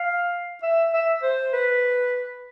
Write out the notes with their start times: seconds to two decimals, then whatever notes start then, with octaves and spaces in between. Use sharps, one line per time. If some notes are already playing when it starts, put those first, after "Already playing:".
Already playing: F5
0.63 E5
0.94 E5
1.23 C5
1.53 B4